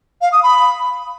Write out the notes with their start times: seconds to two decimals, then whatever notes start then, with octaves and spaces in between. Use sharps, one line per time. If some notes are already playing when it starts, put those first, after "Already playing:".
0.22 F5
0.32 D#6
0.43 B5